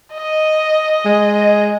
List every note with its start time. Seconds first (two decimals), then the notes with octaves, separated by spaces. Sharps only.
0.15 D#5
1.05 G#3